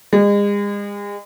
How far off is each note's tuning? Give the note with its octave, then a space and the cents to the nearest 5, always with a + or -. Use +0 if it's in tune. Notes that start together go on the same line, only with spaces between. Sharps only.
G#3 -35